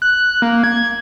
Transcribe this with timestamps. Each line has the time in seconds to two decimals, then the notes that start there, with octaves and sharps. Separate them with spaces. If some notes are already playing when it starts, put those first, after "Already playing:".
0.02 F#6
0.42 A#3
0.64 G#6